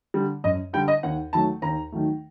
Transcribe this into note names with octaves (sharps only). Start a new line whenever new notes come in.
D3 G3
F#2 D#5
D3 G3 G5
D#5
D#2 F#5
D#3 F#3 A3 A5
D#2 A#5
D#3 F#3 A3